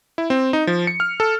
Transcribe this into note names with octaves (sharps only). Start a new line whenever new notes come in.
E4
C4
D#4
F3
C#7
F6
A4